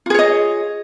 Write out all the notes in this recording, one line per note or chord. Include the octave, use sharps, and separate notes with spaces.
F4 G#4 C#5 D#5